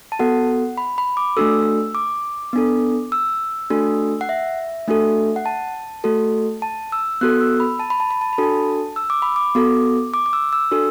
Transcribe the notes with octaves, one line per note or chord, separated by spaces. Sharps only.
A5
B3 F#4 A4 F#5
B5
B5
D6
A3 D4 F#4 A4 E6
D6
B3 D4 A4
E6
A3 D4 F#4 A4
F#5
E5
A3 D4 F#4 A4
F#5
A5
A3 F#4 A4
A5
E6
B3 F#4 A4 F#6
E6
B5
A5
B5
A5
B5
A5
B5
D4 F#4 A4 A5
E6
D6
B5
D6
B3 F#4 A4
D6
D6
E6
E6
D4 F#4 A4 E6